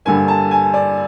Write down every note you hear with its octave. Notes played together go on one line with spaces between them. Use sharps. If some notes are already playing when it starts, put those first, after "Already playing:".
G2 D3 G3 A#3 G#5
A5
G#5
D5